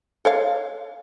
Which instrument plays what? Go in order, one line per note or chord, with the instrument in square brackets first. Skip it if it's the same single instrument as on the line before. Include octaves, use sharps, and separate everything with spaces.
[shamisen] A4 C#5 F5